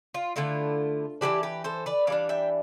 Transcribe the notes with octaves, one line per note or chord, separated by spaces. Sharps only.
F4
D3 A3 E4 F4
E3 G3 D4 E4 G4
G4 B4
A4 C5
B4 D5
E3 G3 D4 D5 F5
E5 G5